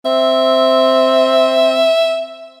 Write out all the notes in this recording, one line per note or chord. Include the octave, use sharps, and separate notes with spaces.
C4 E5